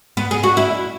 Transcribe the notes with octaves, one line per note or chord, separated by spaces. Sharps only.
B3
G#4
F#4
E4